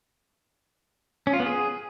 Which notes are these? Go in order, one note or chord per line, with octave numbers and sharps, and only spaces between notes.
C#4
F4
B3
G#4